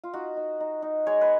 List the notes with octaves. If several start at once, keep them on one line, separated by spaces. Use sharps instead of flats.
F4
D#4 F#4
D#4
D#4
D#4
G#3 C#5
B4